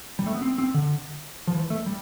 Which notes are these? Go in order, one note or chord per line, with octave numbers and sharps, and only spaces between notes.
G3
A3
B3
C4
C4
D3
F3
E3
A3
G3